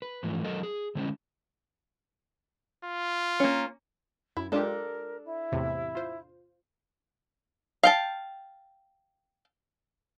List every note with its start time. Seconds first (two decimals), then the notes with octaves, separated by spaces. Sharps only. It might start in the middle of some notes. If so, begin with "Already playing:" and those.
0.02 B4
0.23 G#2 E3 F3 A3
0.45 F#3 A4 A#4 D#5
0.63 G#4
0.95 D3 G#3 C4 C#4 E4
2.85 F4
3.40 A#3 C#4
4.37 F#2 E4
4.52 G#3 D4 F4 G4 A4 A#4
5.25 E4
5.52 E2 A2 C3
5.95 F4 C5
7.83 F5 G5 A5